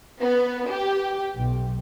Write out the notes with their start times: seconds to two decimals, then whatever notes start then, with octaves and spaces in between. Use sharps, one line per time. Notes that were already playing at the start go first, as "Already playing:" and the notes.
0.21 B3
0.70 G4
1.36 B1